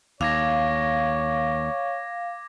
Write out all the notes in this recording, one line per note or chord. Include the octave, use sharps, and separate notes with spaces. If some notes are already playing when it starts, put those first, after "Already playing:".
D#2 C#5 F5 D6 G#6 A#6